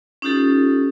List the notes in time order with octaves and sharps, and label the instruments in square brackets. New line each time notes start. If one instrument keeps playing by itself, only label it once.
[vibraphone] C#4 D#4 F4 G4 A4